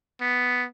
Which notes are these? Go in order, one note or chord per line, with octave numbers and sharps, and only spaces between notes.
B3